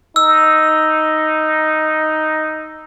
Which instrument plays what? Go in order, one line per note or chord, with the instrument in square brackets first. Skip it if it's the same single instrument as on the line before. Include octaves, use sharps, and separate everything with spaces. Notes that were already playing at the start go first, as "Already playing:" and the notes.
[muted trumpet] D#4 [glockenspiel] E6